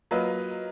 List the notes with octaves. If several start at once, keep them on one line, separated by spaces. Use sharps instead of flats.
F#3 A#3 F4 B4 D#5